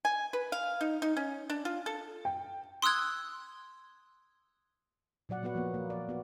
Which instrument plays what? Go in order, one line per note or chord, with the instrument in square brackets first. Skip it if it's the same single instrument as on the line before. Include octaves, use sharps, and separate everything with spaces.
[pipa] G#5
B4
F5
D#4
D#4
C#4
D4
F4
A4
[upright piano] G5
[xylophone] C6 D#6 E6 F#6 G#6
[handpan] A#2 F#3 D5 F#5
F#3 B3 F#4 B4 F#5
F3 A#3 B3
A#3
D5
B3 F#4